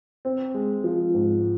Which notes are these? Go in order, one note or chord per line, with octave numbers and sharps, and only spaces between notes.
C4
G#3
F3
G#2